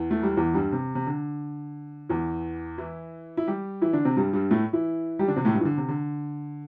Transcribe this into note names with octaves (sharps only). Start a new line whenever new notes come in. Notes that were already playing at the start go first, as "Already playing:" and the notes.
Already playing: E2 E3
A3
G3
E2 E3
G2 G3
C3
C3
D3
E2 E3
E3 E4
E4
G3 G4
E3 E4
D3 D4
C3 C4
G2 G3
G2 G3
A2 A3
E3 E4
G3 G4
D3 D4
C3 C4
A2 A3
G2 G3
E3
D3
C3
D3